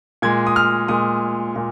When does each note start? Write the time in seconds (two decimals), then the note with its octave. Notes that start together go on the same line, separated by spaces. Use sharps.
0.22 A#2 G#3 G#6
0.47 D#6
0.56 F6
0.88 A#2 G#3 D#6
1.56 A#2